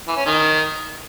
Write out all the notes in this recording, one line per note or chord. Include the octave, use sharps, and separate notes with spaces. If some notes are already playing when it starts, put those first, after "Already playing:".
E3
C#4
D#3